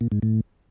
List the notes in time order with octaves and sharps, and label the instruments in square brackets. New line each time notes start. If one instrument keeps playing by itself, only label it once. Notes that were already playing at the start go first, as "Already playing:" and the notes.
[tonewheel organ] A#2
G#2
A2